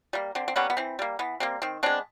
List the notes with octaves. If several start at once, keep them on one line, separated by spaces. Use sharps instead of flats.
G3 A#3
D3 C4
C4
G3 A#3 B3 C#4
B3
E3 C4
G3 A#3
E3 B3
G3 A#3 C4
D#3 C4
G#3 B3 C4 D4